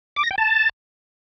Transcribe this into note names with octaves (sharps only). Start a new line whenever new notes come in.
D6
A#6
G5
A5